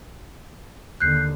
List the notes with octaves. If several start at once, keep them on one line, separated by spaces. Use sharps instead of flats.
D#2 D3 F#6 G6 C7